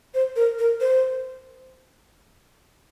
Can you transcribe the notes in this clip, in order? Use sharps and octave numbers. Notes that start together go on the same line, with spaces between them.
C5
A#4
A#4
C5